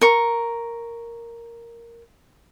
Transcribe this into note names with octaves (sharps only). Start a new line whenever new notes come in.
A#4 C#6